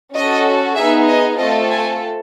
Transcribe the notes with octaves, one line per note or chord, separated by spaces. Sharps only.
C#4 F#4 A4 D#5
B3 D#4 G#4 E5
D#5
A3 C4 F4 A4 D#5
G#5